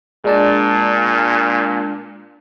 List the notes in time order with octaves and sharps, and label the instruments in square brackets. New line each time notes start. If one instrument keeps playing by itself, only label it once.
[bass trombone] A#2 [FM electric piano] G#3 D4 A5